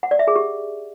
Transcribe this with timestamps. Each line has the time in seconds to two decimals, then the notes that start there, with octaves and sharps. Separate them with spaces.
0.03 F#5
0.11 D5
0.19 E5
0.27 G#4
0.36 G4